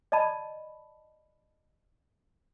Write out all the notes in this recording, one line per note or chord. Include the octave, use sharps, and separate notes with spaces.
D5 D#5 A5 B5